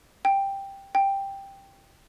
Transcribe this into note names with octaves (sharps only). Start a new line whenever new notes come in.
G5
G5